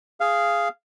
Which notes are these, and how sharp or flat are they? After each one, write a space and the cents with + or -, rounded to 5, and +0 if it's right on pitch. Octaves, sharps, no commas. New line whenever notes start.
G#4 +0 F5 -10